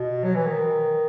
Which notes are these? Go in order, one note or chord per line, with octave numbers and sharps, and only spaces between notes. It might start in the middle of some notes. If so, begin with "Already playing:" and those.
Already playing: B2
F#3
E3
D#3